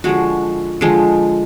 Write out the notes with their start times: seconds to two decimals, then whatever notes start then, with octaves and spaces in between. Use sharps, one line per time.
0.04 D3 F3 G#3 F#4
0.81 D3 F3 G#3